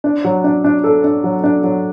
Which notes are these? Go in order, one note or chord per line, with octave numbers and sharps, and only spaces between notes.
D4
F#3
D4
D4
A4
D4
F#3
D4
F#3